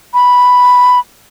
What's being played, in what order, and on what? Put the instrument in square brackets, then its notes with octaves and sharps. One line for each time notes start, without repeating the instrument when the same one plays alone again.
[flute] B5